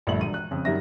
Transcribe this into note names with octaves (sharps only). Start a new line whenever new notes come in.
A#1 G2 D3 A3 F#7
E1 D#7
F#6
F2 C#3
F#2 D#3 G3 E5 A#6